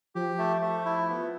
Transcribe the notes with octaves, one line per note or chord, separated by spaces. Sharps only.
F3 G4
A3
A3
E4
B3